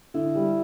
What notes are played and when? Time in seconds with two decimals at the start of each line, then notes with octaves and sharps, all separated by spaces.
0.14 D3 E4
0.35 G3